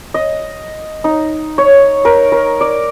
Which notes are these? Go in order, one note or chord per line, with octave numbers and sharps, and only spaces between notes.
D#5
D#4
C#5
A#4
A#4
D5